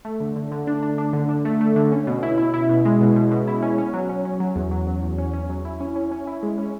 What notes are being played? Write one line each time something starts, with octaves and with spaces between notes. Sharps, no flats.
A3
D3
D3
D3
D4
D4
D4
D3
D4
A3
A3
D3
C#4
B2
E4
E4
E4
B2
G#3
B2
B2
B2
E4
C#4
C#4
F#3
C#4
C#4
F#3
E2
F#3
F#3
E2
C#4
C#4
F#3
E4
C#4
C#4
C#4
E4
G#3
C#4